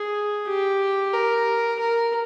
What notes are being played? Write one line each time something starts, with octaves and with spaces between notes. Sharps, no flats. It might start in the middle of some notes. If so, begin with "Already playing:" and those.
Already playing: G#4
G4
A#4
A#4